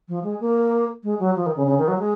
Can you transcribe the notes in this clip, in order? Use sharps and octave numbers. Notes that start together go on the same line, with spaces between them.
F3
G#3
A#3
G#3
F#3
F3
D#3
C#3
C#3
D#3
F#3
G#3